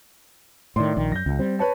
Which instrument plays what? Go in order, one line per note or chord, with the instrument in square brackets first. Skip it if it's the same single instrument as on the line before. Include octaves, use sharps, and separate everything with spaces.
[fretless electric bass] A2 D#3 [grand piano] D5 C6
[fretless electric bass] A#1 D#3
[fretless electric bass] F#2 [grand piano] G6 A#6
[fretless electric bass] C#2
[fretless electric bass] G3 [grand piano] C4
[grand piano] B4 C#5 A5